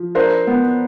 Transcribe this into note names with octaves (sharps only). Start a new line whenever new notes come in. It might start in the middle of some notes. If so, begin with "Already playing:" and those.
Already playing: F3
D4 A#4 C5
B3